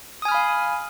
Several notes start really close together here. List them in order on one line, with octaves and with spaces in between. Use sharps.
D#6 G#5 F6 B5 F5